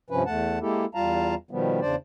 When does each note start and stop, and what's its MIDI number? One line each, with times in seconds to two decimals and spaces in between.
0.10 0.23 43
0.10 0.23 48
0.10 0.23 53
0.10 0.23 61
0.10 0.23 71
0.26 0.59 40
0.26 0.59 57
0.26 0.59 78
0.26 0.59 81
0.61 0.85 56
0.61 0.85 58
0.61 0.85 64
0.61 0.85 67
0.61 0.85 69
0.95 1.35 40
0.95 1.35 55
0.95 1.35 65
0.95 1.35 77
0.95 1.35 81
0.95 1.35 82
1.51 1.80 47
1.51 1.80 51
1.51 1.80 53
1.51 1.80 55
1.51 1.80 59
1.81 1.95 40
1.81 1.95 49
1.81 1.95 62
1.81 1.95 72
1.81 1.95 74